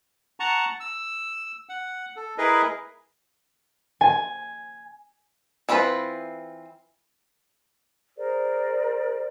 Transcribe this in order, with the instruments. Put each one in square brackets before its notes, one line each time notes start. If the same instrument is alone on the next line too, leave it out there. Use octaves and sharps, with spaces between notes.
[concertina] F#5 A5 A#5 C#6
E6
F#5
A4
E4 G#4 A#4 B4 D#5
[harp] G#5
[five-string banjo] E3 C4 F4 F#4 B4
[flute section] G#4 A#4 C5 D5